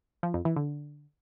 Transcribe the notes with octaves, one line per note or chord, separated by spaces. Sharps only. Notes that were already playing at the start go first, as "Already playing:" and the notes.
F3
F2
E3
D3